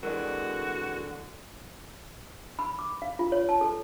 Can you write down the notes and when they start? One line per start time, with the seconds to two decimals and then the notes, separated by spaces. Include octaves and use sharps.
0.03 D3 E3 G#3 C4 F#4 A#4 D5
2.59 B5
2.79 D6
3.02 F5
3.19 F4
3.32 C#5
3.49 A5
3.61 A4